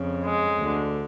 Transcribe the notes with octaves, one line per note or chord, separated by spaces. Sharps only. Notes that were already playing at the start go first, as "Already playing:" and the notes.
Already playing: F2 C#3
G#3
D2 D3